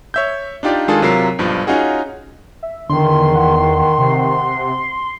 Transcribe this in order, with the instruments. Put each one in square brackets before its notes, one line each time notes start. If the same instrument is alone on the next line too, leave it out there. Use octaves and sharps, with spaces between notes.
[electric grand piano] C#5 E5 G6
D4 D#4 F4 G4 D5
D#3 G#3 D4 F4 G#4 A4
C3 F#3 F4 A#4 C7
B1 G2 F3
C#4 D#4 F4 F#4 G#4
[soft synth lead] E5
[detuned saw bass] E2 [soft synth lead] D3 [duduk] D#3 [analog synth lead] C6
[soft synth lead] F#5
[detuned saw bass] C3